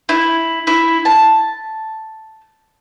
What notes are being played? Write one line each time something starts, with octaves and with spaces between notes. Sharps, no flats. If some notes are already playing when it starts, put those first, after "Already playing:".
E4
E4
A5